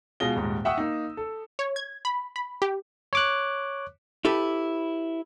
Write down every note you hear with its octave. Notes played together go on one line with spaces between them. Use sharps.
B2 G#3 F4 A#6 G7
D#1 G#2
E5 F#5 G5 C#6 D#6 E6
A#3 D#4
A4
C#5
G#6
B5
B5
G4
C#5 D6 F#6
E4 G4 A4 B4